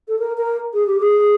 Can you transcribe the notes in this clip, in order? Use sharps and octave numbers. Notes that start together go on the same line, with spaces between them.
A4
A#4
A#4
G#4
G4
G#4